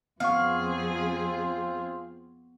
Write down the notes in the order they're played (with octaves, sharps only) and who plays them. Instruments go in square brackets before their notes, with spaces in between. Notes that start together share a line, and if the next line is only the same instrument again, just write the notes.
[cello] F2 G#4 [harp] B3 C#6 [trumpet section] C4 F4 [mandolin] F5